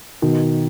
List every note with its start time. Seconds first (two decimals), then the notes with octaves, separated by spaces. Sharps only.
0.22 B2 D#3